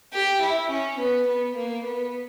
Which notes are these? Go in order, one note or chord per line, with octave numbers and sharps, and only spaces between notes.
G4
E4
C#4
B3
B3
A#3
B3